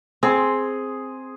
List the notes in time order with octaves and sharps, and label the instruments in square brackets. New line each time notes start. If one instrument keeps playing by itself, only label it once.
[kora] C4 [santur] G#4 C6